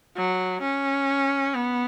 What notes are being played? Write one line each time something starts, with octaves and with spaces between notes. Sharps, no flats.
F#3
C#4
B3